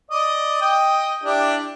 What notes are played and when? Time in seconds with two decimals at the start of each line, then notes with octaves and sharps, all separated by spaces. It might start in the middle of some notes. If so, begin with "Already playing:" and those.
0.11 D5 D#5
0.61 D#5 G5
1.24 D4 E4 G4